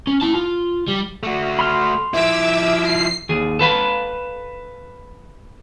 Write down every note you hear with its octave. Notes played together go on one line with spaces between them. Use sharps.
C#4
E4 A5
F4
G3
A3 F#4
B5 C6 F6
F3 E4 E5 D6 E6
C7
D#2 G#4
A4 B4 F5 B5